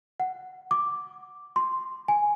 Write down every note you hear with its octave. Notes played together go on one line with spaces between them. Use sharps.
F#5
D6
C6
G#5